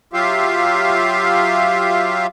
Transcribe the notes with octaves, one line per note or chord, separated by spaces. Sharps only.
F#3 F4 G4 E5 F5